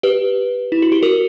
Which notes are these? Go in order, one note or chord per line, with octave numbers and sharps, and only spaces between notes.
G4 B4
E4
F#4
G4
F#4 A#4